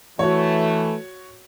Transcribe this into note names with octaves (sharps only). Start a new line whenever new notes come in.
E3 A3 F#4 C#5